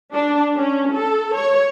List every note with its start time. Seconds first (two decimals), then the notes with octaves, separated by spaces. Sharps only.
0.13 D4
0.56 C#4
0.92 A4
1.36 C#5